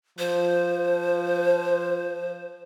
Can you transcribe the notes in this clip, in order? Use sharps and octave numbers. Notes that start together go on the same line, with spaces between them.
F3 C5